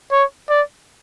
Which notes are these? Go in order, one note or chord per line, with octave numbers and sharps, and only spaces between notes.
C#5
D5